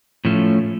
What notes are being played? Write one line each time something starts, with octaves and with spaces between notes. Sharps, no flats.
A2 F3 A3 C#4